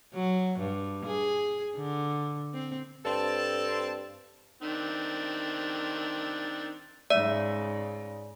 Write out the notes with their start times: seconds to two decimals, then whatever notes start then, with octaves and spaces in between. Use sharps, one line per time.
0.15 F#3
0.59 G2
1.06 G#4
1.76 D3
2.54 C4
3.05 G2 C4 A4 A5
4.62 D#3 C4 D4
7.10 G#2 C#3 D5 E5